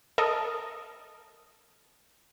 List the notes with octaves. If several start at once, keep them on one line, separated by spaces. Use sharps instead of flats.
A4 A#4 D#5